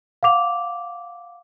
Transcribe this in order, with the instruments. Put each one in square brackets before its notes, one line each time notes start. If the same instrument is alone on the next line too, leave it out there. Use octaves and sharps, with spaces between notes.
[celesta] F5 F#5 D6 F7